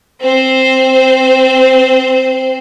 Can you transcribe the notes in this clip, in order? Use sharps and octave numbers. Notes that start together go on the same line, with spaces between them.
C4 C5